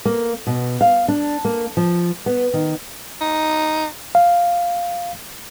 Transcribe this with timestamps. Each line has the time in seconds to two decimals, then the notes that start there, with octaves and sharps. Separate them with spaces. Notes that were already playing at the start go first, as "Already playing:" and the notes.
0.05 A#3
0.47 B2
0.81 F5
1.08 D4
1.45 A#3
1.77 F3
2.26 B3
2.54 D#3
3.21 D#4
4.15 F5